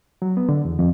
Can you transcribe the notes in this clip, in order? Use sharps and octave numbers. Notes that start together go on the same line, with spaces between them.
F#3
B3
D3
E2
F2